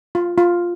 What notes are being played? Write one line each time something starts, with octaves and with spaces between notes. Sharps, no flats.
F4
F4